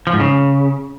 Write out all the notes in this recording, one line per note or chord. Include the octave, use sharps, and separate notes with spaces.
F3
G#2
C#3